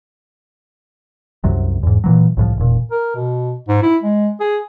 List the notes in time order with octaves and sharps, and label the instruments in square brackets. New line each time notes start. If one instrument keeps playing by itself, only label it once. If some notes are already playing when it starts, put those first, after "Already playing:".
[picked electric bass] C2 F#2 C3 F#3
E2 G#2
A#2 E3 F#3
C2 A2 F3
E1 A#2
[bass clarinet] A#4
B2
G#2
E4
G#3
G#4